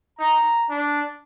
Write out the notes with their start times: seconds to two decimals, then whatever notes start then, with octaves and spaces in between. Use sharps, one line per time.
0.19 D#4 A#5
0.70 D4